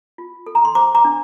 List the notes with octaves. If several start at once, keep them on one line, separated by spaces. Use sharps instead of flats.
F4
A4
A#5
C6
C5 A#5 D6
A#5 D6
D4